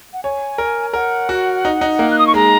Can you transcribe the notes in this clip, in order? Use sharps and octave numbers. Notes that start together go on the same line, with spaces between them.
F#5
C#5 G#5
A#4
A#4 F#5
F#4
D#4
D#4
A#3
F#6
D#6
C#6
G#3 A#5